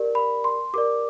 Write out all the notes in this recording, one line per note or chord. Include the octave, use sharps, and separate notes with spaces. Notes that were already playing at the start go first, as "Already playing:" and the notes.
Already playing: G4 A#4 D5
B5
C6
G4 A#4 D5 D6